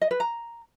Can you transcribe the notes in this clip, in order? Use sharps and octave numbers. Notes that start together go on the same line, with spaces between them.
D#5
B4
A#5